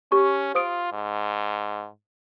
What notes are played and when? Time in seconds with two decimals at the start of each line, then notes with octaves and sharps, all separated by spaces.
0.12 C#4 G4 C#6
0.55 F4 C5 D#6 D7
0.92 G#2